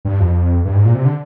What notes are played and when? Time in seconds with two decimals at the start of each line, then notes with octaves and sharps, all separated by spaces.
0.05 G2
0.20 F2
0.65 G2
0.75 G#2
0.85 A#2
0.95 C3
1.05 D3